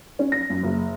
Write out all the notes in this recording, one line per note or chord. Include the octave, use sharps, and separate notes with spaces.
C#4
A#6
F#2
F#1